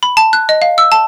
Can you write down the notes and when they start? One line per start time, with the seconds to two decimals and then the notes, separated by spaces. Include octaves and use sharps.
0.03 B5
0.17 A5
0.33 F#6
0.49 D#5
0.62 F5
0.78 E6
0.92 A5